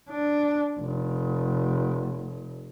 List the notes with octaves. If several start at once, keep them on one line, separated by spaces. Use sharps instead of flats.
D4
F1